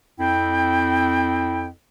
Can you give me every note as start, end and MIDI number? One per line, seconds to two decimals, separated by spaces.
0.19 1.67 41
0.19 1.67 60
0.19 1.67 64
0.19 1.67 79